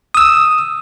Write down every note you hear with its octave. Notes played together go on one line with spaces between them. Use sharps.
D#6 E6